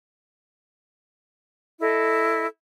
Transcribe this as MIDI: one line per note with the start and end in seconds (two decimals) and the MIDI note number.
1.80 2.46 64
1.80 2.46 69
1.80 2.46 75